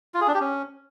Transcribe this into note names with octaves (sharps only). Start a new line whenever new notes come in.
F4
G#4
D4
G4
C#4